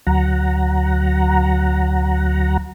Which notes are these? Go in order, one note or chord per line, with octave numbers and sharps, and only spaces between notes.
D2 F#3 F#5 A#5